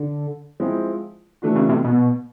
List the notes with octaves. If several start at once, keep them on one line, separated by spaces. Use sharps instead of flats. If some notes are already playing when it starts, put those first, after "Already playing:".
Already playing: D3
F3 G#3 C4 E4
E3 A3 D4 F#4
C#3
C3
B2